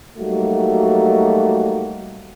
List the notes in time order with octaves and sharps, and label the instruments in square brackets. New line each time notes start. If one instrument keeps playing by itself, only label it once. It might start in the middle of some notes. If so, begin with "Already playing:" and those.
[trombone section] F#3 G3 A3 A#3 D#4 F#4